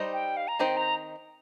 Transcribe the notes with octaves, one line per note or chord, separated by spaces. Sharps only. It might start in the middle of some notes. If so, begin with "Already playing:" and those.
Already playing: G3 D#4 C5 D#5
G5
F5
A#5
D#3 C4 D#4 C5 G5
A#5